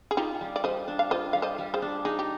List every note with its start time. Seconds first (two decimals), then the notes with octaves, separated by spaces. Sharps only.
0.11 G#4
0.17 D#4 F4 G4
0.41 G3
0.56 D5
0.64 G3 C5 D#5
0.88 D4
0.99 F5
1.11 F4 C5 D#5
1.33 G3 F5
1.42 C5 D#5
1.58 G3
1.74 G#4 C5
1.82 D4
2.05 D#4 G#4
2.19 G4